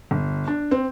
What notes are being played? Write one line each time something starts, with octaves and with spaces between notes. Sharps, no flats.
G1
D4
C4